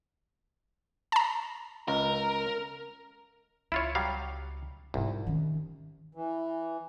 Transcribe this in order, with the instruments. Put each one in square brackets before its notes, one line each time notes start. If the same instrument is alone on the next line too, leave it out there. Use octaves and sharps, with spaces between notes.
[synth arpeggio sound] A5 A#5
[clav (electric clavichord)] C#2 [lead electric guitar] A#4
[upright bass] C#2 [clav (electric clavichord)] E4 F4 C#5
[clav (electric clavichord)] F#3 G3 F5
[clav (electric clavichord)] C2 [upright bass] G#2 F4
[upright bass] D#3 C#4
[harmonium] E3